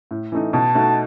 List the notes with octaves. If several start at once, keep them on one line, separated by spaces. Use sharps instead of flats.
A2
E3 A3 D#4
B2 A5
A3 D#4 F#4